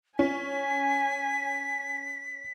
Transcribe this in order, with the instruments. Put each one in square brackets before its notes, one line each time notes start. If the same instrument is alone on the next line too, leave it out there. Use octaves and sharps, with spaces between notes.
[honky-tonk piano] C#4 [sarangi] G#5 [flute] B6